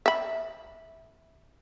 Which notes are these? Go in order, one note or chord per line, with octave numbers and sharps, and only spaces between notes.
E5 B5